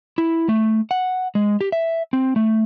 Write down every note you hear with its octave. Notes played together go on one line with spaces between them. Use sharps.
E4
A3
F#5
G#3
G4
E5
C4
A3